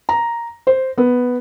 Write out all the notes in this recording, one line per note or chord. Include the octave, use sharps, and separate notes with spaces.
A#5
C5
B3